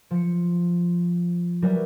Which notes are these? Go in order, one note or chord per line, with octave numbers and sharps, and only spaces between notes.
F3 C#7
F#3 G3 E4 A#4 B4